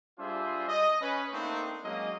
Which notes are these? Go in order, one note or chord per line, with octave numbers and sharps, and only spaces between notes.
G3 D4 F4 G#4 C5 E5
D#5
C#4 B4
A3 A#3 C4 D4 D#4
F#3 G#3 A#3 C#4 D#5